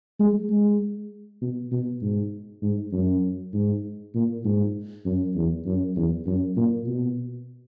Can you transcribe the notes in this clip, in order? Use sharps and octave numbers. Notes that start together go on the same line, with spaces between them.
G#3
G#3
B2
B2
G#2
G#2
F#2
G#2
A#2
G#2
F#2
E2
F#2
E2
F#2
A#2
B2